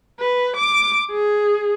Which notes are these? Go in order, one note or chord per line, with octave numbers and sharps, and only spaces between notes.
B4
D6
G#4